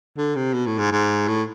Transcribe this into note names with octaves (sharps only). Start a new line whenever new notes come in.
D3
C3
B2
A2
G#2
G#2
A2